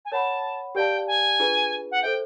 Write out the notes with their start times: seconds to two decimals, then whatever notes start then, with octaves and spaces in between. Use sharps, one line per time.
0.05 G#5
0.11 A#4 C#5 F#5 A5 B5
0.75 G4 A#4 D5 F5 G5 A5
1.07 G#5
1.39 D4 F4 G#4 B4
1.91 F#5
2.02 A4 C5 E5 G5